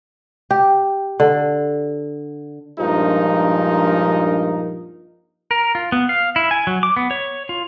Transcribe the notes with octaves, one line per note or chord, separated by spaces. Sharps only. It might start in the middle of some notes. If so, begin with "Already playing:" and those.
G4
D3
A#1 G2 F3 G#3 D#4 A#4
A#4
F4
B3
F5
E4
G#5
F#3
D6
B3
C#5
F4